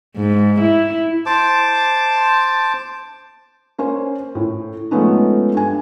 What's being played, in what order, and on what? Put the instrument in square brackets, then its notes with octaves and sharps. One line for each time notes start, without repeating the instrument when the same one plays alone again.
[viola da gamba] G#2
E4
[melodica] C5 A5 D6
[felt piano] A#3 C#4 C5
A2
F3 G#3 A3 B3 C#4 D#4
G2 G#5